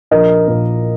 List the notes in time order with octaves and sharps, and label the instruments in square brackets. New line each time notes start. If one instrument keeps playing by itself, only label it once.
[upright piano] A#1 A#4 D#5
A#2 A#3